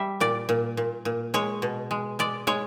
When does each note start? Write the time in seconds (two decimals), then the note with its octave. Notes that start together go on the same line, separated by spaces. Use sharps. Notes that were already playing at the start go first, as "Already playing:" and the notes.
Already playing: G3 E5
0.20 A#2 D5
0.49 A#2
0.77 A#2
1.05 A#2
1.34 G#3 C#5
1.62 B2
1.91 G#3
2.19 G#3 D5
2.47 G#3 C#5